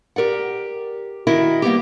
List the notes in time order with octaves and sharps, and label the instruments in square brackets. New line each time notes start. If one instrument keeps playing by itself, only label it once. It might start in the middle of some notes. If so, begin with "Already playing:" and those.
[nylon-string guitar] G4 A#4 D5 F#5
D#3 E4 F#4 A#4 D#5
G3 A#3 B3 G4